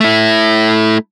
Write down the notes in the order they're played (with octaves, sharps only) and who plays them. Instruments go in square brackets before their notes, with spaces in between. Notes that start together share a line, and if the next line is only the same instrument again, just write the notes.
[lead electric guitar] A3 E4